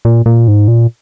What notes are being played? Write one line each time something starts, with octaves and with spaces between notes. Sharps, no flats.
A#2
A#2
G#2
A#2